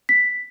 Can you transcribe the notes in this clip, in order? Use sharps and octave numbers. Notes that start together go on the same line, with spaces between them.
B6